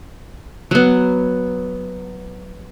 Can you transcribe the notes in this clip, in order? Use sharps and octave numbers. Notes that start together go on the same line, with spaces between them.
F#3 B3